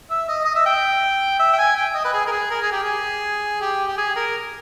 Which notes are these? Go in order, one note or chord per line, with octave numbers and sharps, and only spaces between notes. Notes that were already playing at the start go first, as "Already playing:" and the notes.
E5
D#5
D#5
E5
G5
E5
G5
G#5
G5
D#5
B4
G#4
A#4
G#4
A#4
G#4
G4
G#4
G4
G4
G#4
A#4